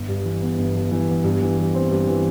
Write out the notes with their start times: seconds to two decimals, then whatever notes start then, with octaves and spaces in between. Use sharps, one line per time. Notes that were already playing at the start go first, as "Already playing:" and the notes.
Already playing: G1
0.08 G2
0.25 E3
0.42 B3
0.58 G1
0.75 G2
0.91 E3
1.09 B3
1.24 G2
1.41 E3
1.58 G3
1.75 C4
1.91 G2
2.08 E3